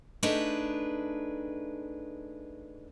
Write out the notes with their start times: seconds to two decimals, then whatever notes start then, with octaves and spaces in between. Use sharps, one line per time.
0.23 A3 D4 D#4 G#4 B4